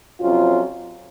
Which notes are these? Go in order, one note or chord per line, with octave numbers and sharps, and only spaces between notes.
F2 C3 F#3 C#4 F4